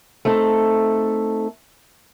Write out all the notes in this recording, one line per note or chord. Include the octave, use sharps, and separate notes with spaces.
A3 C4 D#4 A4